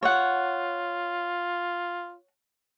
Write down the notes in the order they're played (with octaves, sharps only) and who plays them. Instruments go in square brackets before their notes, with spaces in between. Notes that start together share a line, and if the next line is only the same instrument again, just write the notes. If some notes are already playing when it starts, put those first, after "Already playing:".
[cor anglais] F4 [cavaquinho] C#5 F#5